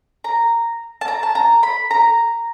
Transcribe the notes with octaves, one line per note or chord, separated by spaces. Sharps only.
A#5
A5
A#5
A5
A#5
B5
A#5